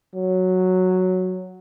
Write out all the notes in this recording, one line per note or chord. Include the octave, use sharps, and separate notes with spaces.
F#3